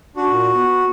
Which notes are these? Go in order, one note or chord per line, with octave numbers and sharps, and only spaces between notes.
D4 F#4
A#2
B3